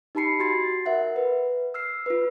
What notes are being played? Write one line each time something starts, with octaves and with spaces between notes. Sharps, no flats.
D#4 G4 A5 B5 C7 C#7
F#4 C6 A6 C7
A#4 E5 F#5
B4
E6 F6 C7
F4 B4